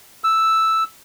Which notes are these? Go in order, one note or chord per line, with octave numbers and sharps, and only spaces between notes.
E6